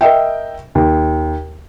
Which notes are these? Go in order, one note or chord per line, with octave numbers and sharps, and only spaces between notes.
A#4 D#5 E5 G5
D#2